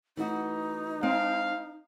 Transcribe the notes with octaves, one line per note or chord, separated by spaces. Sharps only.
E3 A3 D#4 F#4
G#3 C4 F5 A5